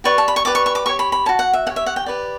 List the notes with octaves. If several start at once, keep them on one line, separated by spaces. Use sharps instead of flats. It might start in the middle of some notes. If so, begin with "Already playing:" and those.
G4 B4 D5 C#6
A5
B5
C#6
G4 B4 D5 D6
C#6
C#6
D6
G4 C#5 C#6
B5
B5
F#4 C#5 A5
F#5
E5
G4 C#5 F#5
E5
F#5
G5
G4 B4 D5